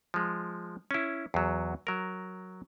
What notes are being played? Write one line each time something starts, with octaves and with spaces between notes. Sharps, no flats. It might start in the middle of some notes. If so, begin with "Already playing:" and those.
F3 G#3
C#4 E4
E2 F#3
F#3 A#4